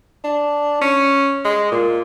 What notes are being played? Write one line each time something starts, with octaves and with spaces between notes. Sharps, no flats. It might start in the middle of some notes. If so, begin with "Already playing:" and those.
D4
C#4
G#3
A#2